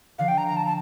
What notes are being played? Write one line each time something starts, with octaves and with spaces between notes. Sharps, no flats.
D3 F3 F5
G5
A#5
A#5
A5
A5